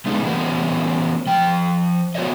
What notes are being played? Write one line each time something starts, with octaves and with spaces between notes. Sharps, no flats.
G#3 A3 B3 D4 D#4 G#4
E3 B3 C#4 G4 A#4 C5
F3 G5
B3 F#4 C5 C#5 D#5